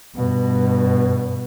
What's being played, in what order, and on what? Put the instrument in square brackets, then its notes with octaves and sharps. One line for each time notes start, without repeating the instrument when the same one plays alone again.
[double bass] G2 B2